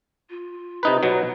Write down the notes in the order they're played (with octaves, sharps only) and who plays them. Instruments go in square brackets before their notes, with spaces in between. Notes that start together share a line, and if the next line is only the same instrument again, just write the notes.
[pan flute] F4
[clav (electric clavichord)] C3 D#4 B4
B2 F#3